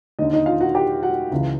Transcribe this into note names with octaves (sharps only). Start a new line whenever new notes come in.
D#2 D3 D#4 D#5
D#4 D#5
F4 F5
F#4 F#5
G4 G5
F#4 F#5
C#2 C#3 E3